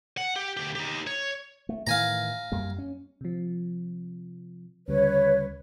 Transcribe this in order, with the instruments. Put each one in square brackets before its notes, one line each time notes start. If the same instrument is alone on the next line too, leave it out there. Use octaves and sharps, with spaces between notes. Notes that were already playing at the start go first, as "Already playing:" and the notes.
[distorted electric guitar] F#5
G4
D2 G4
D#4 G4
C#5
[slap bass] A3
[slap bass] A2 D#3 E3 [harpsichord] F5 G#5 A#5
[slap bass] F#2 G3 A#3
C#4
[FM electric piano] C3 F3
[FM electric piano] D2 C#3 G3 [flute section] B4 C#5